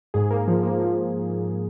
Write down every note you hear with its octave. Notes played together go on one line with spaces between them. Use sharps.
G#2 G#4
A#3
F3
A#3
F3